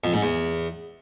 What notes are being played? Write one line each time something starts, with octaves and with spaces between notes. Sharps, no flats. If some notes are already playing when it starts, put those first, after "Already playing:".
F2
G#2
E2